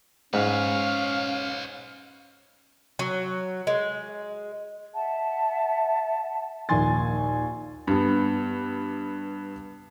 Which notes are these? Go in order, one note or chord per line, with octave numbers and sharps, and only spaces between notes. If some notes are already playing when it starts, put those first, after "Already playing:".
G#2 C#4 B4 C#5 F5
F#3
G#3
E5 F#5 A5
A#1 D#2 G#5 C6 A6
G2 B3